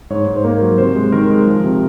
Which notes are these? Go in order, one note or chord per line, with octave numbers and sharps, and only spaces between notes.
G#2 C#5
G#2
C5
A#3 A#4
F#3
C3 C5
G#3
D#3 A#4
G#3
F3
C3